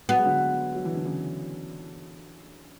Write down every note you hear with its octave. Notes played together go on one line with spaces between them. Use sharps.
F#3 B3
G#3
D3 F#3
F#3
E3
D3
C#3 E3